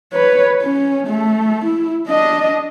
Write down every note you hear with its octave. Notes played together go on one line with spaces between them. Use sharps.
B4 C#5
C#4
A3
E4
D4 D#5